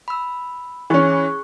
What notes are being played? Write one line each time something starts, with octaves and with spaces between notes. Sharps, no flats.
B5 E6
E3 C#4 G#4 C#6 F#6